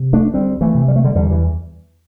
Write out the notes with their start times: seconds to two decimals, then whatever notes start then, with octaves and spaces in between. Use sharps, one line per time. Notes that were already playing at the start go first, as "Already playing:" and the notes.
Already playing: C3
0.13 A3 D4
0.33 D2 G3 C4
0.61 E3 A3
0.74 C3
0.88 G3
0.96 A3
1.04 D3 G3
1.15 E2 D3 G3
1.31 E3